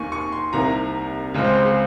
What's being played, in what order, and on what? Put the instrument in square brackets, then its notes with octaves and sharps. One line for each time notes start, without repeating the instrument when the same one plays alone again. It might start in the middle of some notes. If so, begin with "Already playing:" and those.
Already playing: [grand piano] D#2 D#3 A#3 G#5 C#6
C#6
C6
C2 C3 D#3 A#3 A#5
C#2 C#3 G#3 C4
C5
C5
G#4